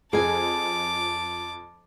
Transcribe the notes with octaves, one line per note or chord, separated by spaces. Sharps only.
F2 F3 G#4 G#5 A5 D6